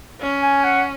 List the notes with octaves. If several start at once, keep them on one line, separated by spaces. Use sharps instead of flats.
C#4
G#5
F#5